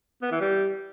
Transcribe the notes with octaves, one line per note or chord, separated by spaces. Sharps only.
B3
E3
G3